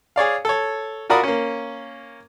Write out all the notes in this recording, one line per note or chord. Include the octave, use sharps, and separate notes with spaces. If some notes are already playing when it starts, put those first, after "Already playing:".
G#4 C#5 D5 F5
A4 C#5
F4 F#4 A#4 D5 B5 D#6
A#3 C#4